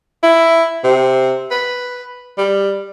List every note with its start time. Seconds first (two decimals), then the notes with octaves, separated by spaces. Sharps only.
0.23 E4
0.84 C3
1.51 B4
2.38 G3